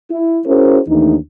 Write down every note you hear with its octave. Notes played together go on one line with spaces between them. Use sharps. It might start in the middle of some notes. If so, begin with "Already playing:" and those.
E4
C#4 E4 F#4 G#4 A#4 C5
D#2 E3 A3 D4 D#4